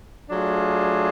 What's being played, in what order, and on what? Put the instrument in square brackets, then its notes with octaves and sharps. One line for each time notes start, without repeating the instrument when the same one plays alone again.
[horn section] F#3 A3 D4 F4 G#4